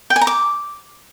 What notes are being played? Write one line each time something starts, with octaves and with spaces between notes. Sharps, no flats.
G5
G#5
A#5
D6